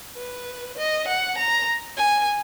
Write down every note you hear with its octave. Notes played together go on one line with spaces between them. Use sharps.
B4
D#5
F#5
A#5
G#5